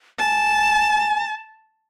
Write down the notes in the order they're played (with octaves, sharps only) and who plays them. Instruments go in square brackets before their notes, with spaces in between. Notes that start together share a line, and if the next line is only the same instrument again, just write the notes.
[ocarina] G#5 [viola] A5